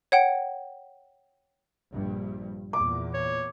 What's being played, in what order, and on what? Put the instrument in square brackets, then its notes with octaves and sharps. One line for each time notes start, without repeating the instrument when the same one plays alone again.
[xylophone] C#5 F#5 G5
[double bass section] A#1 G2
[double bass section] E2 A#2 [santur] D6
[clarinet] C#5